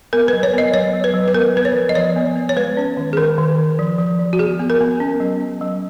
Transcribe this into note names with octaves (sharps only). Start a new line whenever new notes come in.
B3 A#4
F#3 B4
C#5
B3 D#5
F#3 C#5
F#3
B4
F#3
B4
B3 A#4
B3 B4
C#5
F3
D#5
F3 C#5
B3
B3
C#5
G#3 B4
C#4
D#3
G#4
D#3 A#4
D#3
D#3
F3
F3
F3
F#4
B3 G#4
B3
A#4
B3
C#4
F#3
C#4
F#3